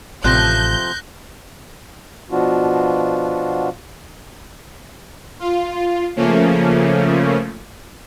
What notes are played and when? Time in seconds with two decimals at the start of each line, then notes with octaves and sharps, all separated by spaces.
0.24 A1 C3 F3 A3 F#6 G6 A#6
2.31 B2 F3 B3 D4 F4 F#4
5.39 F4
6.16 C#3 F3 A3 A#3 C#4